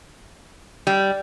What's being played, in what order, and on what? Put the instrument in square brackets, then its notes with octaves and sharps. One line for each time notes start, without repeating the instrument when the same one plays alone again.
[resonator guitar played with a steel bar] G3